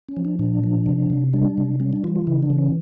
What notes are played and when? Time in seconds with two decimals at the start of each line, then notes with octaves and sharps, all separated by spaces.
0.09 C#4
0.17 F3
0.25 D4
0.39 A#2 D4
0.64 F3
0.86 C3
1.10 C3
1.34 G3 D4
1.58 C3
1.80 G3 C#4
1.93 D4
2.04 E3 F4
2.16 F4
2.27 C#3 E4
2.43 D4
2.50 E3
2.58 C#4